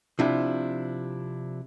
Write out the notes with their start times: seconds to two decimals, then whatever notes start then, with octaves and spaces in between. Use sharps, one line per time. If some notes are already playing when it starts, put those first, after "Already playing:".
0.19 C3 F3 D4 E4